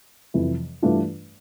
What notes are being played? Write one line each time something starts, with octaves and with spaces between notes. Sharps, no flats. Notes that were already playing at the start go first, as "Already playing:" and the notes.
F2 C3 E3 G3
G2 E3 A3 D4 F4